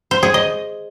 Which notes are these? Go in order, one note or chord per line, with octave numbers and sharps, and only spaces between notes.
C5
G#4
D#5